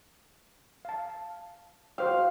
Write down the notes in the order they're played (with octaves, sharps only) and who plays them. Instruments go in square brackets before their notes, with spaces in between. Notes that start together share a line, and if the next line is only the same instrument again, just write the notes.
[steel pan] F5 A5
[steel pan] F#4 C5 G5 [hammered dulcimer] F5